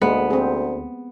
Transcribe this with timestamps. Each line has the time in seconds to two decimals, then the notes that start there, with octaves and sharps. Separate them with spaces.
0.02 D2 G#3 A#3 B3
0.30 C4 G#4